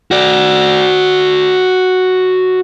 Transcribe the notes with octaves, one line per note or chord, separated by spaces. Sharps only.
F#4 D5